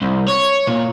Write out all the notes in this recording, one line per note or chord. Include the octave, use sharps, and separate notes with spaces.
C2
C#5
A#2